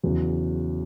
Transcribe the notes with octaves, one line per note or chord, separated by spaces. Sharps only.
E2 C#3 F#3